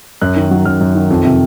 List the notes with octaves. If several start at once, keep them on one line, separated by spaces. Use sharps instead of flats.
F#2 F#6
D#3
F#3
F#2 F6
F#2
D#3
F2
C3